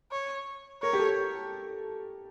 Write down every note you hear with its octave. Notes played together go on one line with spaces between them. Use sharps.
C#5
A#4 C#5
G4
A4